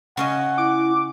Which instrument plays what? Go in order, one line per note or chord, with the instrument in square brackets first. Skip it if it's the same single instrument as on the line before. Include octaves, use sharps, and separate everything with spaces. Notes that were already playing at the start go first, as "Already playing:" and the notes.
[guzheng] C#3 C#4 D#5 [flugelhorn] F#5
[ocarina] E4 [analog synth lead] D6